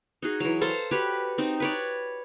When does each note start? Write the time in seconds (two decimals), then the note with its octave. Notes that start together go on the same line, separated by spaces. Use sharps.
0.22 D#4 F#4 G#4
0.40 E3 F#3
0.61 A4 C5 F5 A#5
0.91 F#4 G4 B4 C#5
1.38 C4 D#4
1.60 B4 C#5 D5